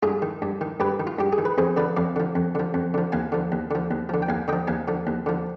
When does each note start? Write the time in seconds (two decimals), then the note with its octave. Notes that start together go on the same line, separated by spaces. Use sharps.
0.03 G2 F4 G#4
0.22 D#3
0.42 G2
0.61 D#3
0.80 G2 G4 B4
1.00 D#3
1.07 F4
1.19 G2 G4
1.33 G#4
1.38 D#3
1.45 B4
1.58 F2 G#4 C5
1.77 D3 F3 B4 D5
1.96 F2 D5 F5
2.16 D3 F3
2.35 F2
2.55 D3 F3
2.74 F2
2.94 D3 F3
3.12 D#2 F5 G#5
3.32 D3 F3
3.52 D#2
3.71 D3 F3
3.91 D#2
4.09 D3 F3
4.22 G5
4.29 D#2 F5 G#5
4.48 D3 F3 D#5 G5
4.67 D#2 F5 G#5
4.88 D3 F3
5.07 D#2
5.26 D3 F3